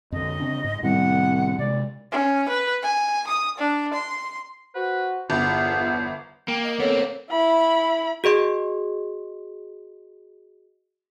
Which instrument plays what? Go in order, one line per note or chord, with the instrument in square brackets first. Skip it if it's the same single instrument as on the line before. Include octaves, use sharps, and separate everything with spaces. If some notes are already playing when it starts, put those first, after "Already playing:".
[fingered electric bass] F2 D3 [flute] D#5
[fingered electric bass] C#3 C4 D4
G#2
[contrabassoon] C2 [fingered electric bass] A2 D#3 G3 [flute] F#5
[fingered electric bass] C3 G#3 [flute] D5
[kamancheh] C#4
B4
G#5
D#6
D4
C6
[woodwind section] F#4 C5 [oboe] B4
[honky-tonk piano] G1 [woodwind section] E2 [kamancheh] B3 F4 [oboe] C5
[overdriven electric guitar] A#3 [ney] G5
[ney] D#5
[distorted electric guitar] B3 C4 [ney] A4 [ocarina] C#5
[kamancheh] E4 B5
[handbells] F#4 G#4 D#5 C6